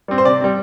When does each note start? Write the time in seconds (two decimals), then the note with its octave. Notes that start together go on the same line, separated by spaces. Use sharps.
0.08 G3 C4
0.18 C5
0.25 C3 D5
0.41 G3 C4